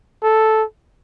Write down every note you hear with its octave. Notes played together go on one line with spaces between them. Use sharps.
A4